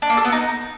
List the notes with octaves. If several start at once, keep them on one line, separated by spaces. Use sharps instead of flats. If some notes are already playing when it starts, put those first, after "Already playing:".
D4
A#3
A4
B3
D#4